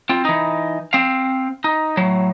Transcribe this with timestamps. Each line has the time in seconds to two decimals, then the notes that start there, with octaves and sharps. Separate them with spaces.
0.09 C4 F4
0.25 E3 D#4
0.93 C4 F5
1.64 D#4
1.97 A2 F#3